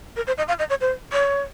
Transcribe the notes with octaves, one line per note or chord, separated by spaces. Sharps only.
A#4
C5
D#5
F5
D#5
C#5
C5
C#5